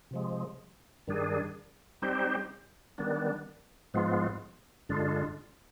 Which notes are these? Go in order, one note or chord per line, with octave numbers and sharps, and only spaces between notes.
C3 F3 G#3
G2 D#3 G3 D4 G#4
G3 C4 D#4 G4 C5
D#3 G3 B3 D4
G#2 F3 G#3 B3 F4
G2 D3 G#3 D4 F4